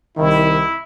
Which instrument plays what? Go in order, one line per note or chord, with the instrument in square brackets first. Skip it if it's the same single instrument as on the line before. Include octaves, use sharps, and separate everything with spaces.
[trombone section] C2 D#3 [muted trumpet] E4